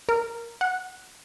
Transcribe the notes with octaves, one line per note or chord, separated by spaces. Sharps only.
A#4
F#5